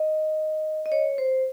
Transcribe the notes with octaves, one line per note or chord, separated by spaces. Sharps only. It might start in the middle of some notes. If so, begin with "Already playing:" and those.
Already playing: D#5
D#5
C#5
C5